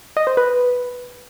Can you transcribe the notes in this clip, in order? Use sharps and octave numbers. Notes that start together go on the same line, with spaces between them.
D#5
C5
B4